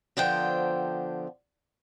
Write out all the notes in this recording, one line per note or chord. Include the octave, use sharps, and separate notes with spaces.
D3 F3 B3 C5 G5